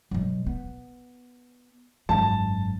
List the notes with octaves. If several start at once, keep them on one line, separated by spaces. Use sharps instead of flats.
B2 F#3
B3
G#1 F#2 A5